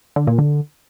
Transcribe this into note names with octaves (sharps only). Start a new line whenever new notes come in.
D3
A#2
D3